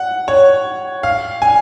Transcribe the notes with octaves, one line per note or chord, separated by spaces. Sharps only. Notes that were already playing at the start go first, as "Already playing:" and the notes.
Already playing: F#5
C#5
F5
G#5